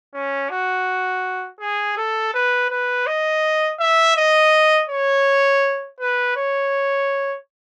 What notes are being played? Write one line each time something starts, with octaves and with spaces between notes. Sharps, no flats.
C#4
F#4
G#4
A4
B4
B4
D#5
E5
D#5
C#5
B4
C#5